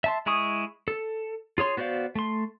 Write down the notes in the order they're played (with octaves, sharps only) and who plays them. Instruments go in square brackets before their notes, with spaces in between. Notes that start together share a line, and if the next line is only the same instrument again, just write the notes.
[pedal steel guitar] E5 A5 C6
G#3 E4 G#4 C#6 D#6
A4
F4 G#4 C#5 C6
B3 F#4 C5 D5 F5
A3 C6